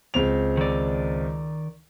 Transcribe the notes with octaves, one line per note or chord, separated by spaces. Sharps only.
C#2 C4 F7
D#3 D5